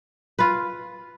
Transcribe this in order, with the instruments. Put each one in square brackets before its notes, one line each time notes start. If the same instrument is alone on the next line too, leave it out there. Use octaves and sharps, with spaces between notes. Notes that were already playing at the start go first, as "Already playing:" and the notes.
[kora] F4 B4